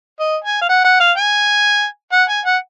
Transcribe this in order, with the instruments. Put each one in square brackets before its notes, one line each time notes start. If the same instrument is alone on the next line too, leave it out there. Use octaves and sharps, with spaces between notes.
[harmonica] D#5
G#5
F5
F#5
F#5
F5
G#5
F#5
G#5
F#5